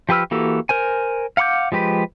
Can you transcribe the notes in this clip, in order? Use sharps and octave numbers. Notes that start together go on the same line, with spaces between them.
F3 G4 B4 E6 F6
E3 A#3 F#4 G4 A4
A#4 C5 G#5
F5 F#5 B5 D6 G6
F3 G#3 G4 B4